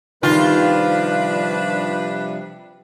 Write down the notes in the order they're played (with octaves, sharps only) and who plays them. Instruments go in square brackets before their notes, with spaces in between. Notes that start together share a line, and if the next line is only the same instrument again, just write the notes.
[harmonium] C3 F3 G3 [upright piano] D#3 [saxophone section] D4 B4 [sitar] F4